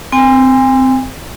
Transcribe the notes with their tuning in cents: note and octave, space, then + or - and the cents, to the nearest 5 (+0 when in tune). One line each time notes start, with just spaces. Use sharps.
C4 -15 G#5 -40